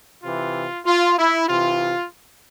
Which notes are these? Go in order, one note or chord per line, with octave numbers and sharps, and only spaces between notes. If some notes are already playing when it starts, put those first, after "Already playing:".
C3 E3 F4
F4
E4
C3 E3 F4